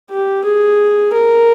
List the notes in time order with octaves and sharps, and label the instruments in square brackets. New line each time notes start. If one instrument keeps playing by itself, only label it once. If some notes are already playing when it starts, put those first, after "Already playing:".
[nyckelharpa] G4
G#4
A#4